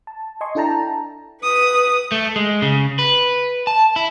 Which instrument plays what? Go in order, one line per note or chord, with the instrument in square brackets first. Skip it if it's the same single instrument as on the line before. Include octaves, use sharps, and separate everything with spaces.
[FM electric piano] A5
D#5 G#5 C6 C#6
D4 E4 A4 G5 A5 A#5
[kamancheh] B4 D#6
[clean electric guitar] A3
G#3
C#3
B4
A5
E4